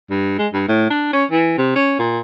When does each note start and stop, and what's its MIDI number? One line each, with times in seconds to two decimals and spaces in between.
0.10 0.37 43
0.39 0.48 56
0.53 0.64 43
0.68 0.89 45
0.90 1.11 62
1.13 1.24 61
1.31 1.54 52
1.58 1.71 48
1.76 1.95 61
1.99 2.20 46